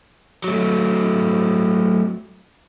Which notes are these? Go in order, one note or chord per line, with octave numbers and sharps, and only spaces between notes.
F#3 A3